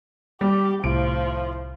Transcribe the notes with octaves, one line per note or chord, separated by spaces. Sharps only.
G3 G4
C2 A2 F3 D7